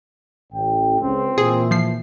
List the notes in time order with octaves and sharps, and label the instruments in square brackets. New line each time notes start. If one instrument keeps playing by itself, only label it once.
[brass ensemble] A1 G5
[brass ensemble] C#2 [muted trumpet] C4
[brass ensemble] A#2 E3 [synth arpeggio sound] G#4
[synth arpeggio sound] F3 C7